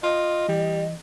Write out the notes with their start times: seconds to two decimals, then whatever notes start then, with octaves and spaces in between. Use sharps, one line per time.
0.03 F4 D#5
0.49 E3 G3